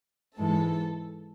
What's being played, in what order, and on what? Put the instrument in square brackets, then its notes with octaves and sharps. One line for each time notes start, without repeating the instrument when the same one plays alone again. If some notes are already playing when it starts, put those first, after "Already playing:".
[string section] G#2 E3 G#3 A4